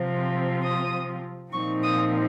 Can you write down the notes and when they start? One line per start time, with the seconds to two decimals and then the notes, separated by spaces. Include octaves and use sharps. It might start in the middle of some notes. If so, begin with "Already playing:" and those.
Already playing: C3 F3 C4 F4
0.63 D#6
1.52 A#2 F3 C4 D#4 C#6
1.83 D#6